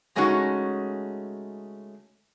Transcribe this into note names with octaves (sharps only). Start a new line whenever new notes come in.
C#3 G#3 A3 C#4 D#4 F#4